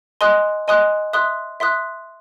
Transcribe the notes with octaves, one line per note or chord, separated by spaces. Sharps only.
D#5 G#5 C6 D#6 F#6
D#5 G#5 C6 D#6 F#6
E5 C6 D#6 F#6
E5 C6 D#6 F#6